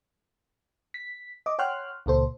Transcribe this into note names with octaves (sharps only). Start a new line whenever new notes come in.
B6
D#5 D6
C#5 F#5 G5 C6 F6 F#6
C#2 A#2 A4 C5